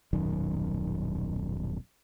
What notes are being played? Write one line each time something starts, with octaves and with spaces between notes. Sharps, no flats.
D#1 B1 F#2 D#3